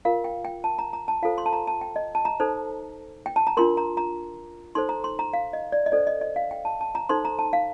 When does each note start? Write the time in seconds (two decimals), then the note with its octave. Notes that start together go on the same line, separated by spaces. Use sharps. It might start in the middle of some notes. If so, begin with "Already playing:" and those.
0.05 F4 A#4 F5
0.24 G5
0.45 G5
0.64 A5
0.79 A#5
0.93 A#5
1.08 A5
1.22 F4 A4 C5 F5
1.38 C6
1.46 A5
1.53 A#5
1.67 A5
1.81 G5
1.96 D#5
2.15 A5
2.25 A#5
2.40 D#4 A4 C5
3.26 G5
3.36 A5
3.47 A#5
3.57 D4 F4 A#4 C6
3.77 A#5
3.97 A#5
4.75 D#4 A4 C5 C6
4.89 A#5
5.04 C6
5.19 A#5
5.33 F5
5.53 D#5
5.72 D5
5.86 D#5
5.92 D4 A4 C5 D5
6.07 D#5
6.21 D#5
6.36 F5
6.51 G5
6.65 A5
6.81 A5
6.95 A#5
7.09 D#4 A4 C5 C6
7.25 A#5
7.39 A5
7.53 F5